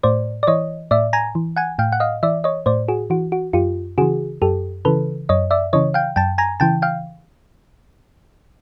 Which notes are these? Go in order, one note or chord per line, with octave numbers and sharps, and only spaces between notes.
A2 C5 D5
D5
E3 C#5 D#5
A2 D5 E5
G#5 A#5
E3
F#5 G#5
A2 F5 G5
F#5
D#5 F5
E3 D5 E5
C#5 D#5
A2 C5 D5
F#4 G#4
E3 F#4
F#4
F#2 F4 G4
C#3 E3 F#4 G#4
F#2 G4 A4
C#3 E3 A4 B4
F#2 C#5 D#5
D5 E5
C#3 E3 C#5 D#5
F5 G5
F#2 G5 A5
G#5 A#5
C#3 E3 G5 A5
F5 G5